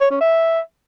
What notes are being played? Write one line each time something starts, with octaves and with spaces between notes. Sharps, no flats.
C#5
C#4
E5